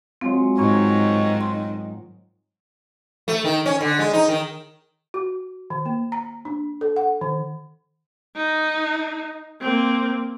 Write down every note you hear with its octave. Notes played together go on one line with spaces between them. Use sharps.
F#3 G#3 C4 F4
G#2 D#3 C#5 A#5
C6
A3
D#3
C#4
D3
G#3
D#4
D#3
F#4
D#3
A#3
A#5
D4
A4
F#5
D#3
D#4
A#3 C4